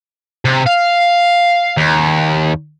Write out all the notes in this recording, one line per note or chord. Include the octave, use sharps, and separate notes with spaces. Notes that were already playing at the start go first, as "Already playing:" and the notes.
C3
F5
D#2